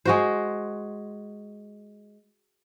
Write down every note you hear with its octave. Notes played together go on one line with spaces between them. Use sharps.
G#3 F#4 C5